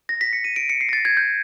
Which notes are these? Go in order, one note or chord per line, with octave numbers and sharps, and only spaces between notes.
A#6
B6
C#7
D#7
D7
C#7
C7
A#6
A6
G#6
G6